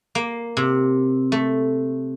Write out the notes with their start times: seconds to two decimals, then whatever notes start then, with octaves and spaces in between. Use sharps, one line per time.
0.15 A#3
0.57 C3
1.32 A3